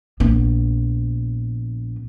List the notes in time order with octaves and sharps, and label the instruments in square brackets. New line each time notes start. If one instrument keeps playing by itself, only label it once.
[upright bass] A#1 B3